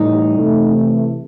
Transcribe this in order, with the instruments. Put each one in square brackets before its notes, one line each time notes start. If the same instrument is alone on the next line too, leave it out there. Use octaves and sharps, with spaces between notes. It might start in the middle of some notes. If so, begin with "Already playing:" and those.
Already playing: [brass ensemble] A2 E3 G3 [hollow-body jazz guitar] D#4
[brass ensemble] C3 E3 A3